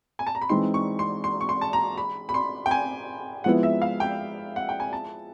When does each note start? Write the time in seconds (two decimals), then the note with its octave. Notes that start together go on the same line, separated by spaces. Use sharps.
0.19 G#5
0.27 A5
0.35 A#5
0.42 B5
0.49 E3 G#3 C4 D#4 C6
0.74 C#6
0.99 C6
1.24 C6
1.41 C#6
1.49 C6
1.61 A5
1.73 A#5
1.98 B5
2.29 B5
2.34 C6
2.66 G5
2.71 G#5
3.44 F3 G#3 B3 E4 F#5
3.63 E5
3.82 F5
4.00 G5
4.56 F#5
4.69 G5
4.80 G#5
4.93 A5